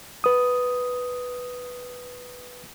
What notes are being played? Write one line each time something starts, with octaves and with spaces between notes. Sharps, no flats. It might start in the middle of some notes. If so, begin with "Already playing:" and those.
B4 D#6